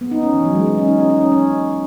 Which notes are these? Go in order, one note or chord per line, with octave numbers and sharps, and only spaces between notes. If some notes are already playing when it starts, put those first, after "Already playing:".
B3
D#4
C#4
E3
F#3
G#3
G#3
C#4
D#4
C#4
D#4
C#4
C#4